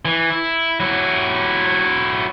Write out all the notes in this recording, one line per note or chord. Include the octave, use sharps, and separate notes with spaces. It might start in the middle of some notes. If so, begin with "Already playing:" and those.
E3
E4
F#3 E4